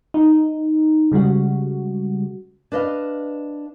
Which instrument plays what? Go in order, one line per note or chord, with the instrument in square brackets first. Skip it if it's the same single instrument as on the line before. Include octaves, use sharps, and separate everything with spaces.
[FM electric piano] D#4
C#3 G3 G#3 F#4
[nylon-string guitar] D4 B4 D#5 F5